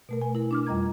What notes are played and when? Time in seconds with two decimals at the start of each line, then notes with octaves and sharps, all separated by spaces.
0.09 B2 A3 A#4
0.21 G#5
0.35 E4 A#4
0.51 D4 D6 F6
0.67 F2 G3 D#5 A#5 G#6